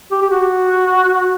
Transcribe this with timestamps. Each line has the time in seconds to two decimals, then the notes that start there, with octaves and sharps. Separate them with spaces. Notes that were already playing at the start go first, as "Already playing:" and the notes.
0.12 G4
0.22 G4
0.30 F#4